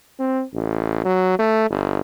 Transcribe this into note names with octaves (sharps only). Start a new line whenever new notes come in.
C4
A1
F#3
A3
G1